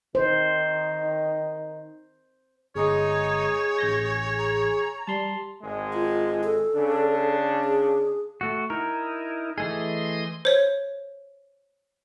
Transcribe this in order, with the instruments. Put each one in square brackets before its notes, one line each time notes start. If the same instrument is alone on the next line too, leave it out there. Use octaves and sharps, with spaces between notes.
[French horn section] D#3 D#4 [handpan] C5
[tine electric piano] G1 G#3 [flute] D#4 [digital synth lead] G#4 [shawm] C#5
[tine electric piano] A1 G6 A#6
[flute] A#5
[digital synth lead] G3 [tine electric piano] A5 C6
[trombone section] G#1 G#3
[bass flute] F4
A4
[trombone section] C#3 D4
[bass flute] G#4
[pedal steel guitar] A3 F#4
[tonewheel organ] D#4 E4 [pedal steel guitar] A#4
[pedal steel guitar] E3 A3 G#4 [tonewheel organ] D#5 C6 D#6
[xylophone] C5 C#5